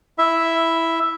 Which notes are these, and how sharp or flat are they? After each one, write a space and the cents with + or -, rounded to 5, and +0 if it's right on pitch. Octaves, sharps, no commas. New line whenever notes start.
E4 +0 E5 +0